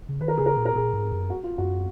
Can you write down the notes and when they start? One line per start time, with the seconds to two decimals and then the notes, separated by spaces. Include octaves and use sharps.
0.09 C#3
0.21 D#3 B4
0.28 A#4
0.37 C#3 G#4
0.46 A#4
0.57 A#2
0.66 A#4
0.75 A#2 G#4
0.94 G#2
1.12 F#2
1.30 F#4
1.43 F4
1.58 F#2 F#4